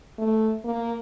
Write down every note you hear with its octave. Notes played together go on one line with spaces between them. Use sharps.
A3
A#3